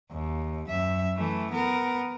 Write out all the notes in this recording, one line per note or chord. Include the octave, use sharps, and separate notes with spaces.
D#2
F#2 E5
E3 A3
B3 A#4